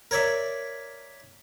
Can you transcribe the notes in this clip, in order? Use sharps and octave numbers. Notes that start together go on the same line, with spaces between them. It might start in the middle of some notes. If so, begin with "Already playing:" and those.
A#4 C#5 D5 E5